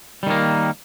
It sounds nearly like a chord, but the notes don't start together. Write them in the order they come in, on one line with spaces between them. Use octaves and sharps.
G3 D#3 A#3